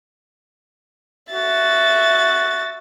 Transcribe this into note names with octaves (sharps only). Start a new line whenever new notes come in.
F#4 E5 A6